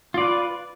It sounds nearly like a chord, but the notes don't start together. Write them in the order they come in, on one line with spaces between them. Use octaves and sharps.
F4 D5 B4